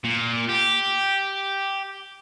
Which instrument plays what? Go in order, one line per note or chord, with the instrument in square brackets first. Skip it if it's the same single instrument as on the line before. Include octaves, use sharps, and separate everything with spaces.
[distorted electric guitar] A#2
G4